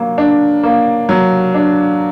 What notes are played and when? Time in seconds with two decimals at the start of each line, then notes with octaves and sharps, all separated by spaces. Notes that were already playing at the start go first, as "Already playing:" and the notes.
Already playing: F#3 A#3
0.18 D4
0.63 A#3
1.09 F#3
1.54 D4